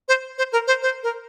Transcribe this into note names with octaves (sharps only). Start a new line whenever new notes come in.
C5
C5
A#4
C5
C5
A#4